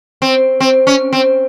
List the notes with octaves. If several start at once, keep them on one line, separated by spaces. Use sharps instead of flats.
C4
C4
C#4
C4